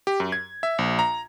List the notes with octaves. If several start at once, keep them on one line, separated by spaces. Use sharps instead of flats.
G4
F#2
G#6
E5
A#1
A#5